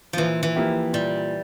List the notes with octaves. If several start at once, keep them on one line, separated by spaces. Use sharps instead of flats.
A#2 E3 F3
E3
F3 A#3 E4 G4
A#2 G3